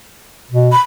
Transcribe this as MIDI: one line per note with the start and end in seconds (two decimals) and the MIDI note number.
0.51 0.72 47
0.72 0.80 83